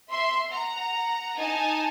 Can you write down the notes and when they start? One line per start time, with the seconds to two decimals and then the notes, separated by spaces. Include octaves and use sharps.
0.10 E5 C6
0.50 F#5 A#5
1.37 D#4 G#5 A5